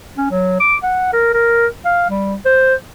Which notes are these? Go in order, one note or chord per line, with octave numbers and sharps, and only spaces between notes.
C#4
F#3
D6
F#5
A#4
A#4
F5
G3
C5